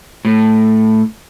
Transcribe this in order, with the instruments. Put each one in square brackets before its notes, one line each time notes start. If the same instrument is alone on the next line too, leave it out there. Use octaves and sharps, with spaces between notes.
[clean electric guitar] A2